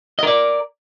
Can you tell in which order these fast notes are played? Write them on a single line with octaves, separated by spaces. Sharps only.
D#5 A#4 D5